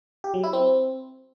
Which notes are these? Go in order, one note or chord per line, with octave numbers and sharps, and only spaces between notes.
G4
F#3
E4
C4